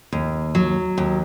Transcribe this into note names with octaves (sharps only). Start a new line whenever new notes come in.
D#2
F#3
D#2